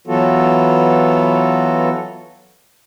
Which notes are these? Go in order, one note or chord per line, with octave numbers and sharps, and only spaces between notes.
E3 F#3 B3 F4 F#4 A4